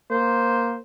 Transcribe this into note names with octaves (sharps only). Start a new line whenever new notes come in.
A#3 C5